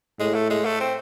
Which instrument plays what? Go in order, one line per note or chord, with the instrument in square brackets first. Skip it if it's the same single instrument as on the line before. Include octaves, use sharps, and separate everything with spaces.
[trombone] A2 [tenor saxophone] G#3
[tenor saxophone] A3
G#3
A3
C4